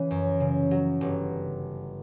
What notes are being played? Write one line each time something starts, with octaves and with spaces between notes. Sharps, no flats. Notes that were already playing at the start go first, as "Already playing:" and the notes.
Already playing: C#3 E3
F#2
C#3
F#3
G1